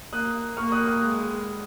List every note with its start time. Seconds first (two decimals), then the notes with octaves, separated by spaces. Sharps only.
0.13 A#3 D#6 F#6
0.57 A#3 C#6 F6
0.72 D#6 F#6
0.87 D#6 F#6
1.02 G#3